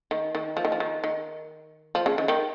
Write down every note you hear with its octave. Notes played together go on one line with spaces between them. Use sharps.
D#3
D#3
F3
D#3
F3
D#3
D#3
F3
C#3
D#3
D#3